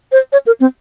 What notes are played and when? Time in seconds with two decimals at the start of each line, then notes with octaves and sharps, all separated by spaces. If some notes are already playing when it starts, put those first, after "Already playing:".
0.12 C5
0.33 C#5
0.47 A#4
0.60 C4